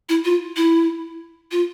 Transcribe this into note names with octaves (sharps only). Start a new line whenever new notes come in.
E4
F4
E4
F4